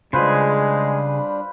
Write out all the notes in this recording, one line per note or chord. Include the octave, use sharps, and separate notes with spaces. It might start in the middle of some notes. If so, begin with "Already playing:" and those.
C#3 G3 G#3 D4 F4 G#4 B4 C5